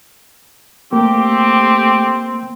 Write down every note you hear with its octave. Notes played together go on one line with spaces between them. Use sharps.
A3 A#3 C4 G4